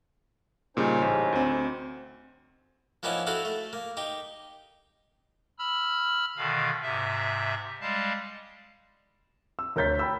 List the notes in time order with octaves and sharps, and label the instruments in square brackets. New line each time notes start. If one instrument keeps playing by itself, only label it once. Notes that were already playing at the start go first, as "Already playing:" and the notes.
[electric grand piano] A#2 C#3 G3 [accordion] C#4 D#4 C5
[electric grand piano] A1
D2 C4
[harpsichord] F3 A#3 B3 C#4 D#4 E4
E4 F#4 A4 F5
A3
A#3
D#4 G4
[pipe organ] B5 E6 F6
B2 D3 D#3 F5
G#2 C3 E5
G3 G#3 F5 A5
[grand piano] E6
D2 A#4 C#5 G6 A6 B6
G5 B5 E6